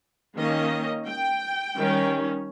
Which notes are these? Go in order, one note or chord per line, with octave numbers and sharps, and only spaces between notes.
D#3 A#3 C#4 D#5
G5
D#3 G3 C#4